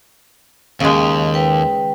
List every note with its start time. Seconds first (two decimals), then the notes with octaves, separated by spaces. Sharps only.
0.80 D#2 C#3 G#3
1.34 B4 G5